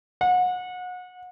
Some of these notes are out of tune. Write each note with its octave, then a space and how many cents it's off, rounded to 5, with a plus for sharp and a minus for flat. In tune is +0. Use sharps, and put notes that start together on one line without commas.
F#5 -30